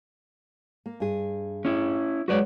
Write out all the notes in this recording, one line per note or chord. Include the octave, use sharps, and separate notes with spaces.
A#3
G2 G#4
C#4 E4
F#3 G#3 F#4 B4 C#5 D5